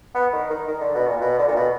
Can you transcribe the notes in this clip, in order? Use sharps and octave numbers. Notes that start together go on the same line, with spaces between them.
B3
D#3
D#3
D#3
D3
B2
A#2
B2
D3
A#2
B2